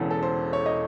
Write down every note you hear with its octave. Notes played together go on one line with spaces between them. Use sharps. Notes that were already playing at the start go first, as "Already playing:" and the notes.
Already playing: E1 E2 C#3 E3 G#4 A4
A4
C5
C#5
D#5